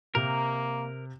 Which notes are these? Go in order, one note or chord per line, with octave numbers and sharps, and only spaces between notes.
C3 A#3 G4 A#4